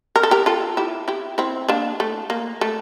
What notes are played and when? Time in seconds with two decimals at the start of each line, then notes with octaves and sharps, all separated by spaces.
0.16 A#4
0.23 A4
0.31 G4 A#4
0.46 F4 A4
0.77 E4 G4
1.08 E4 G4
1.38 C4 E4
1.69 A#3 D4
2.00 A3
2.30 A#3
2.61 A3